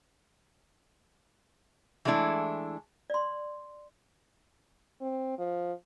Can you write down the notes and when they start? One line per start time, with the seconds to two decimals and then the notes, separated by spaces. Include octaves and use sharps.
2.05 E3 G#3 A3 D4 E4
3.10 D5 C6
5.01 C4
5.38 F3